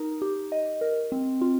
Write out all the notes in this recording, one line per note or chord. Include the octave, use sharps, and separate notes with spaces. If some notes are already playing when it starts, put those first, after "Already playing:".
Already playing: D#4 A#4
G4
D#5
A#4
C4
F4